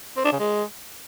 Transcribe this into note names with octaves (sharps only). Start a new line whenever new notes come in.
C4
D4
C#3
G#3